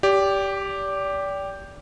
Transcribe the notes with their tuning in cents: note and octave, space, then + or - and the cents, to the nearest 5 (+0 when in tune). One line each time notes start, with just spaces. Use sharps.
G4 +0 D5 -30